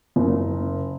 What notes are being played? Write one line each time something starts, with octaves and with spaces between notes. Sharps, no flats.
F#1